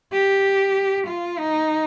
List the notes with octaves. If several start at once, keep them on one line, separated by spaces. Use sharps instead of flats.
G4
F4
D#4